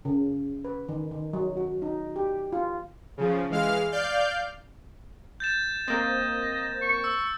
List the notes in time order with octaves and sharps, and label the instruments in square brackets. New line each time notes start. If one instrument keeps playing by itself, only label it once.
[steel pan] C#3
B4
D#3
D#3
F#3
F#4
D#4
G4
F4
[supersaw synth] C#3 F3
E3 G#3 F5 F6
D5 F5 F6 G6
[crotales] G6 A6 E7
[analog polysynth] A#3 C4 [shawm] D#5
[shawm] C#6
[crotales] E6